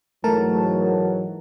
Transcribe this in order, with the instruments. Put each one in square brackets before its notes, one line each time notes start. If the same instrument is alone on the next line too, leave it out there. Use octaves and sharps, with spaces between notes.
[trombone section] G#2 E3 F#3 [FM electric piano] A3 A#4 A5